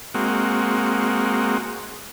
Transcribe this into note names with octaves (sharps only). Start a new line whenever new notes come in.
G#3 A#3 C4 F#4